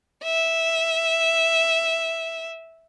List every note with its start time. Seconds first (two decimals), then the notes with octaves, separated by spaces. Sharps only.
0.24 E5